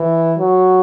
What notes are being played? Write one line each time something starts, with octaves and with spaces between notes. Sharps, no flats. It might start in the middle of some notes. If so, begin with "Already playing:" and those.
Already playing: E3
F#3